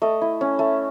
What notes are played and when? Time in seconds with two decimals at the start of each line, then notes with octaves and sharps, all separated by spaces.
0.02 A3 D#5
0.21 E4
0.41 C#4
0.59 A3